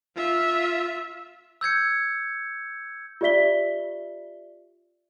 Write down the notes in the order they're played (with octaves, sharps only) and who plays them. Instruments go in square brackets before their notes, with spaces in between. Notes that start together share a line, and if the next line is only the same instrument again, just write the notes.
[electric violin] F4 E5
[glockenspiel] E6 G6 G#6 C#7
[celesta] F4 G4 D5 E5 B6 G7